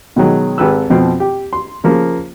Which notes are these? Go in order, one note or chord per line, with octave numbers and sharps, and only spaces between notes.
B2 D#3 F#3 G#3
G#1 G4 B4 E6
F2 B2 F3 C4
G4
C6
C#3 F3 A#3